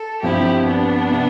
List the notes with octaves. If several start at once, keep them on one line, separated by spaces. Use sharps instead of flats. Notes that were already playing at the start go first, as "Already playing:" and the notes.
Already playing: A4
G2 F3 C4 E4 G4
B3 D4
C3